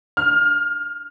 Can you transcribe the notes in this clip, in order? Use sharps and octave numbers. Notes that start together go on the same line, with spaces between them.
F6